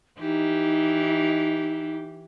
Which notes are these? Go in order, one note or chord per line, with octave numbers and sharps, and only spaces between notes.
E3 D#4 G4